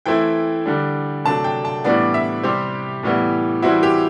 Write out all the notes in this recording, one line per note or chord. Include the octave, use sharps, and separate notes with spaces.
E3 A3 C4 E4 G5
D3 G3 D4
C3 F#3 A3 D4 A5
G5
A5
A2 E3 G3 B3 D4 D5
E5
C3 G3 C4 G4
A2 E3 G3 B3
E3 G3 C4 E4 F#4
G4